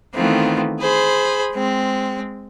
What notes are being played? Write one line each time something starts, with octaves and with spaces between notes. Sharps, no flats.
D#3 E3 A3 B3 C4 F4
G#4 C5 B5
G#3 C4